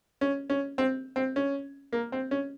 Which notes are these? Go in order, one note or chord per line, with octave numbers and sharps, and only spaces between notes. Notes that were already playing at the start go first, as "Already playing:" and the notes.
C#4
C#4
C4
C4
C#4
A#3
C4
C#4